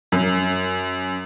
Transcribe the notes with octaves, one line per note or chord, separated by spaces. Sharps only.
F#2